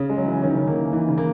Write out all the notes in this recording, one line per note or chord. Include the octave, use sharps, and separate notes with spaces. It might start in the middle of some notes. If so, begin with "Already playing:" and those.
Already playing: C#3 C#4
G#3
F#3
E3
D#3 C#4
C#3
D#3 A#3
E3
D#3 E3
C#3
A#3